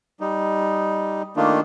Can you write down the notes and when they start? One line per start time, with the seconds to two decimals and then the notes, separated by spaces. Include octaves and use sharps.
0.20 G3 D#4
1.36 D#3 A3 A#3 D4 D#4 F4